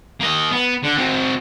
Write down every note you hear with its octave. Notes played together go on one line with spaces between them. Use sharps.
A#3 D#5
B3
D3
C4 F#4